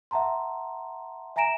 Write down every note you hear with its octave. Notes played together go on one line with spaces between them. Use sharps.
E5 F#5 A5 A#5 C6
E5 G#5 A#5 A#6 D7 E7